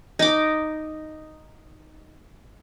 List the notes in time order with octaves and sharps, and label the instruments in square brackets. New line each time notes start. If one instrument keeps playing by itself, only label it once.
[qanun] D#4 D6